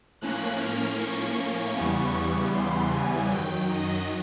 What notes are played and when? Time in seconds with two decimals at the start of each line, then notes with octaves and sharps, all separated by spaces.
0.21 A2 F3 A#3 C#4 F#6
0.60 F6
0.99 C#6
1.76 E2 C#3 E3 G3 B3
2.54 C6
2.93 G#5
3.31 F#2 D#3 F#3 G5
3.70 D#5